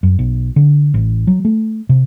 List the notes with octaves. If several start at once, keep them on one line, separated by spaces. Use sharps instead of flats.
F#2
B1
D3
A1
F#3
A3
C3